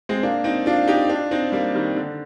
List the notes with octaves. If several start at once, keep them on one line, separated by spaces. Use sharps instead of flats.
G#3 C4
A#3 D4
C4 D#4
D4 F4
D#4 G4
D4 F4
C4 D#4
G3 A#3
D#3 G3
D3